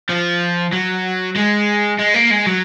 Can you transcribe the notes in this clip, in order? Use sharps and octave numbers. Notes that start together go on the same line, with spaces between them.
F3
F#3
G#3
G#3
A#3
G#3
F#3